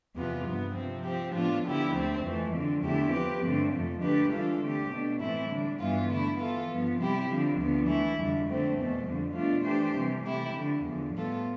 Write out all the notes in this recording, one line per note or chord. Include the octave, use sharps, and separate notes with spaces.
E2 C3 F3 B3 F4
G2 F3 B3
C3 F3 C4
F3 C4 G4
A2 F3 B3 D4 F4
D3 F3 B3 E4 G4
D2 D3 A3 C4
F2 E3 A3
D3 F3 C4
E2 D3 A3 E4 G4
F3 C4 G4 B4
G2 D3 A3 C4
F2 C3 F3 A3
D3 A3 D4 G4 B4
E3 G3 D4 F4 A4
D3 A3 C4 G4
B2 A3 D4
A2 E3 A3 C4 E4
D3 G3 D4
G2 E3 G3 B3 F4
D3 A3 E4
E3 B3 F4 A4
G2 F3 B3
C3 G3 C4 E4 G4
D3 F3 C4
D2 D3 F3 B3
E3 A3 E4
F2 D3 G3
D3 A3 C4
E2 B2 A3
F2 D3 G3
B2 A3 D4 F4
E3 A3 D4 G4 C5
C3 E3 G3
C3 E3 A3 E4 G4
D3 F3 A3
E2 D3 F3
A2 G3 B3 F4 A4